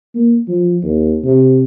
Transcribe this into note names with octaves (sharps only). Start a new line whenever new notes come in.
A#3
F3
D#2
C3